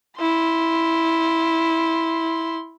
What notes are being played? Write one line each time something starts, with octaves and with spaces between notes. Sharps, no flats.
E4 C6